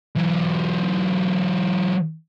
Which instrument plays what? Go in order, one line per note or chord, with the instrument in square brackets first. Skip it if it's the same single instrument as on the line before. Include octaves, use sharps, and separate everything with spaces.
[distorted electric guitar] E3 F#3